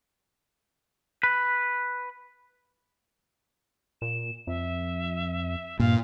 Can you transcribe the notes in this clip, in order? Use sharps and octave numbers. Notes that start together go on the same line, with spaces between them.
B4
A#2 E7
F2 E5
G2 A#2 F5